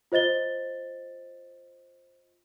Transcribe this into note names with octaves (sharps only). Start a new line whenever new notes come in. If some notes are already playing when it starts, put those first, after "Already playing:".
F4 C5 D#5 A6 G7